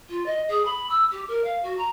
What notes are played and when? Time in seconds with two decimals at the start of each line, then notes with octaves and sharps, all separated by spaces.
0.09 F4
0.26 D#5
0.48 G#4
0.65 B5
0.89 E6
1.11 G4
1.28 A#4
1.44 F5
1.62 F#4
1.77 A#5